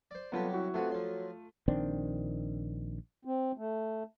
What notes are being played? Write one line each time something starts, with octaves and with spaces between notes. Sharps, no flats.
C5 D5
C2 F#3 B3 F4 G4 A4
E4 F#4
C3 A3 B3 C4 F4
F3 F#3 C6
A#1 D#3 C4 D4
C4
A3